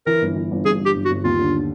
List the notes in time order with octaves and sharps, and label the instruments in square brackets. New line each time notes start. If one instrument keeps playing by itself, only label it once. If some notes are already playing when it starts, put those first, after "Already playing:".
[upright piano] E3 [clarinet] A#4
[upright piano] G1
E3
G1
[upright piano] G2 [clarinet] G#4
[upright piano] G1 [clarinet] G4
[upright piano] G1
[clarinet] F#4
[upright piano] G1
[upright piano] D#2 [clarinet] F4
[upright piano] D3